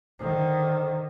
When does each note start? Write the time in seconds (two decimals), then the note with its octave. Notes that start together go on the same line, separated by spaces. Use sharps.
0.19 D3 D#3 C5